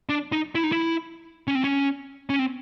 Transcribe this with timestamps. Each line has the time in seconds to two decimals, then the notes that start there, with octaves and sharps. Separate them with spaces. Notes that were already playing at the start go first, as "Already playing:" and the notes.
0.09 D4
0.32 D#4
0.55 E4
0.64 D#4
0.72 E4
1.48 C#4
1.55 C4
1.64 C#4
2.30 C#4
2.39 C4